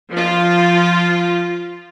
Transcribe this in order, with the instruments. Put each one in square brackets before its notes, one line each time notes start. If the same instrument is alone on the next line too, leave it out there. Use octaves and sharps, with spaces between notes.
[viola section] F3 F4